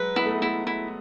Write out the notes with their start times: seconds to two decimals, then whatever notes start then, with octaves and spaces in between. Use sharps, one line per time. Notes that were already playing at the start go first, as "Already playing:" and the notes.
Already playing: F#3 G#3 B4
0.16 B3 E4
0.26 A3
0.34 G#3
0.42 A3 E4
0.67 E4